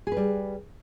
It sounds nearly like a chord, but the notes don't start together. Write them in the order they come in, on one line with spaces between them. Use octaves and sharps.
G#4 B4 G3